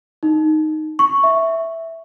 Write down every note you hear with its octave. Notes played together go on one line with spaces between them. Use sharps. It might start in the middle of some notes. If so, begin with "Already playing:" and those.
D#4
C#6
E5